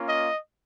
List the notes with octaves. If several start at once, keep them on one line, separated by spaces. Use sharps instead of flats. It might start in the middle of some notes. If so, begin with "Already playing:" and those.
Already playing: A#3 C#4 F4
D#5